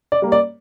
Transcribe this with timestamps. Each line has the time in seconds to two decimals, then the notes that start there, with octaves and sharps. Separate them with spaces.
0.12 D5
0.22 G3 A#3
0.32 D5